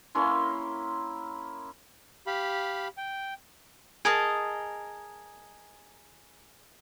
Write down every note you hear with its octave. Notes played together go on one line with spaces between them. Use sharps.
A#3 C#4 E4 C6
G4 F5 B5
G5
G#4 A#4 D#5 A5